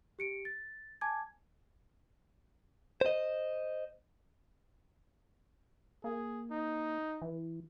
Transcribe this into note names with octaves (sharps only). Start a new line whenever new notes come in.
G4 C#7 D7
A6
G#5 A5 D6 G#6
C5 D#5
A#3 G#4
D#4
E3